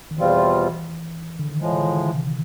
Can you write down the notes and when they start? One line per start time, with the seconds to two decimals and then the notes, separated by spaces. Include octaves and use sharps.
0.11 D#3
0.17 E2 B2 E3 G3 C4 F4
1.39 D3
1.50 D#3
1.61 A2 E3 F3 G#3
1.72 D3
1.79 D#3
1.97 D3
2.14 C3